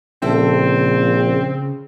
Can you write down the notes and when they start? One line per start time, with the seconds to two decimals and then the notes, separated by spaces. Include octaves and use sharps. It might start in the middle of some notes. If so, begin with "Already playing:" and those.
0.22 A#1 C#3 C4 E4 A4